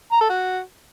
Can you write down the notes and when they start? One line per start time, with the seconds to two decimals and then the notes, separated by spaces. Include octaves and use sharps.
0.12 A#5
0.21 A4
0.29 F#4